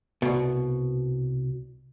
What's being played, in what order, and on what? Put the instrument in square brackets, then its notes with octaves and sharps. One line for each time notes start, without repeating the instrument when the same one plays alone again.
[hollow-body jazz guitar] C2 B2